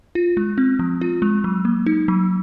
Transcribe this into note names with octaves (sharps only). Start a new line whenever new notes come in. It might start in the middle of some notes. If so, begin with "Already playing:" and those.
F4
G#3
C4
F3
F4
G#3
F#3
A#3
D#4
F#3